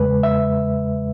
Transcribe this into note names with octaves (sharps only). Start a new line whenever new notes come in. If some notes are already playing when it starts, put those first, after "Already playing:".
Already playing: E2 C#3 G#3 B4
E5